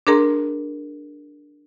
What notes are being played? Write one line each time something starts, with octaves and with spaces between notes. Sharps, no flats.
D4 G#4 A#4 A#5 C6